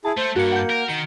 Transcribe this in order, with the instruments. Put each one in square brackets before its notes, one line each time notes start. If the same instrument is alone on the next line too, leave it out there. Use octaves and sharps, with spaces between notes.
[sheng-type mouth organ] E4 G#4 [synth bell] A5
[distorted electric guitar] A3 [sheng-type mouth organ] C5
[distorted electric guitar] G2 [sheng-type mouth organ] A#3 [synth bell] F#4 C#7
[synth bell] F#5 G6
[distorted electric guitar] A#4
[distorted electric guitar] D#3 [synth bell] C#7